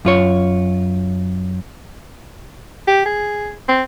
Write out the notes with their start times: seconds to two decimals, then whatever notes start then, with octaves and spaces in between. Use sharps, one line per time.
0.05 F#2 F4 C#5
2.88 G4
3.06 G#4
3.69 C4